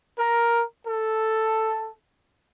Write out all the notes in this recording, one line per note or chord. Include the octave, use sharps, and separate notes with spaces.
A#4
A4